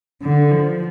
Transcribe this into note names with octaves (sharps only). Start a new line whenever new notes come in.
D3
F3